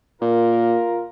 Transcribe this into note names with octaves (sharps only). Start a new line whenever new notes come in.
A#2 F4 A#4